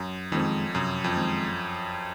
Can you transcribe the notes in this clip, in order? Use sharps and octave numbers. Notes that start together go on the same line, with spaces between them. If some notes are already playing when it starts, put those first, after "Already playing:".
Already playing: F#2
F2 D#3 G#3 C4
F#2 C3
F2
D#3 G#3 C4